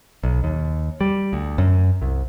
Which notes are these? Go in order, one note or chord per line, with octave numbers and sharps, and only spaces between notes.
B1
D#2
G3
D2
F#2
C2